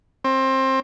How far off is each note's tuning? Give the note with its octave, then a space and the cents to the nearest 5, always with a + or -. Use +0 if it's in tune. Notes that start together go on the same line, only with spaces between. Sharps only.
C4 +20